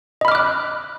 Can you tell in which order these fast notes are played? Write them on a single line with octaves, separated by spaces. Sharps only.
D#5 B5 F6 D6 F#6